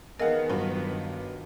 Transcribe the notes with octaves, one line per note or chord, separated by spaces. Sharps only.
D#3 B3 G#4 A#4 D#5 F5 F#5
G2 F#3 F4 B4